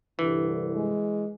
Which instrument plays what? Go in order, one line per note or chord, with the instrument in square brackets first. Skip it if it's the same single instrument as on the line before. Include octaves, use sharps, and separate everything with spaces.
[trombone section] C2 G2 D3 [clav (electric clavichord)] E3
[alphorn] G#3